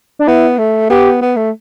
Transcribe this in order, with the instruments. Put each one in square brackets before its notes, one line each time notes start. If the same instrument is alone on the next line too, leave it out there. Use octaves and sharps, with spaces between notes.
[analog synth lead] D4
[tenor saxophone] B3 [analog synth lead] E4
[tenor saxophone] A3
[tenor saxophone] B3 [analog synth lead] G4
[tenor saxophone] B3
A3